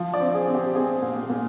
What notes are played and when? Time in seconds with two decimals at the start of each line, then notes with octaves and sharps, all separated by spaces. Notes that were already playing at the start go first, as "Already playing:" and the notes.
Already playing: F3
0.14 D5
0.20 C4
0.34 G#4
0.48 C4
0.55 G4
0.75 C4 G#4
1.02 A#2
1.30 A#2